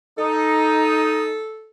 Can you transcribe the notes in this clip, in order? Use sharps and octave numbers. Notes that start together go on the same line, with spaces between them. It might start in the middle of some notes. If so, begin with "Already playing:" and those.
D#4 A4